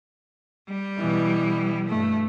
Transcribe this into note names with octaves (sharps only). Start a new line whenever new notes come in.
G3
B2 E3
G2 A3